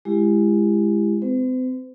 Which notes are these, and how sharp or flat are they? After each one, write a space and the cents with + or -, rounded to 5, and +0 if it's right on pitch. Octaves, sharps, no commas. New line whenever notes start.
G#3 +0 E4 +30 G4 +20
C4 -40 C5 -45